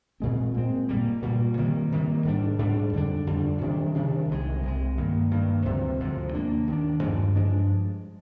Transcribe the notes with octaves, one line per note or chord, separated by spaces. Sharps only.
A#2 G#3 C4
A#2 G#3 C4
A#2 G3 A#3
A#2 G3 A#3
C3 D#3 G3 A#3
C3 D#3 G3 A#3
G#2 G3 D4
G#2 G3 D4
F2 D3 G3 D4
F2 D3 G3 D4
C3 D#3 G3 D4
C3 D#3 G3 D4
C2 C3 F3 G#3
C2 C3 F3 G#3
G2 D#3 A#3
G2 D#3 A#3
D2 C3 F3 G#3
D2 C3 F3 G#3
D#2 D#3 A#3 D4
D#2 D#3 A#3 D4
G2 F3 G#3 D4
G2 F3 G#3 D4